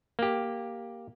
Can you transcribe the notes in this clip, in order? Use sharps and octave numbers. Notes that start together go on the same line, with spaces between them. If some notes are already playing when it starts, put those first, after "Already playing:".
A#3 G4